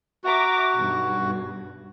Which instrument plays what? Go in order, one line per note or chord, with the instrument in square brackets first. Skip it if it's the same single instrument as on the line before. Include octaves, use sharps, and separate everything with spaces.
[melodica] F#4 [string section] E5 A#5 D6
[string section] B1 G2